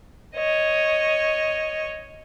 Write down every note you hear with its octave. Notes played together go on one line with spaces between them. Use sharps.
C#5 D#5